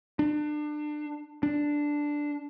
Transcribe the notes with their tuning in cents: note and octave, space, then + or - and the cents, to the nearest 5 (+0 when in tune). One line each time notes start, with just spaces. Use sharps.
D4 +30
D4 +0